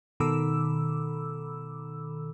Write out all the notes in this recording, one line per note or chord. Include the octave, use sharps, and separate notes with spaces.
B2 D#3 A4 B5 D6 E6